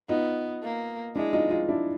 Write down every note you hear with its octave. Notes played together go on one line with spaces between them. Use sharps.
B3 D#4 F4
A#3
G#3 D4 E4
D#4 F4
D#4 F4
D4 E4